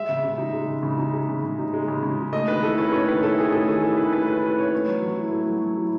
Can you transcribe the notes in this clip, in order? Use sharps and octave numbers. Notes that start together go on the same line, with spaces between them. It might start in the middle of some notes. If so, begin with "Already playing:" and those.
Already playing: G#3 E5
C#3
C#3
D#4
G#3
C#3
C#3
D#4
G#3
C#3
C#3
D#4
G#3
C#3
C#3
D#4
A3 D#5
D#3 B4
E4 A4
C#4 B4
A3 C#5
D#3 B4
E4 A4
C#4 G#4
A3 A4
D#3 G#4
E4 A4
C#4 B4
A3 B4
D#3 B4
E4 B4
C#4 C#5
A3
F#3
F#3
E4
A3
F#3
F#3
E4